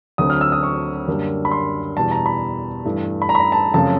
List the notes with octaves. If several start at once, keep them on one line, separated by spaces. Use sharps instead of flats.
D2 D3 F#3 A3 C4 D#6
F6
E6
D#6
C#6
F#2 D3 G3 A#3
B5
C6
E2 B2 G3 A5
A#5
B5
G2 E3 A3
B5
A#5
B5
A#5
A5
F#2 C#3 F3 A3 C4 A5